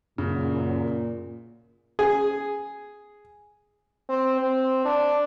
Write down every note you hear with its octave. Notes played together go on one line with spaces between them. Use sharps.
F#2 A#2 C#3
G#4
C4
C4
D4